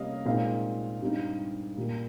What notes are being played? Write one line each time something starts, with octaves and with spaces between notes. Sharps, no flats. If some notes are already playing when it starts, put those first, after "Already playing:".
Already playing: C3 G3 A#3 C#4 D#5 F5
A#2 G#3 C4 D#4 F5
G2 G3 C4 D#4
A#2 G3 A#3